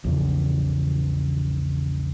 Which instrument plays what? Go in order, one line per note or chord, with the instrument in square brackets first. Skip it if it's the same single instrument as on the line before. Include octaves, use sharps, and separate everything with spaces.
[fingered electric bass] A#1 E2 C#3